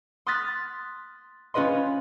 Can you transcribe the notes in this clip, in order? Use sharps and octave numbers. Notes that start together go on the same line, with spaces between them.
C6 D#6 F6 F#6 A6 B6
C#4 F4 B4 D#5 C6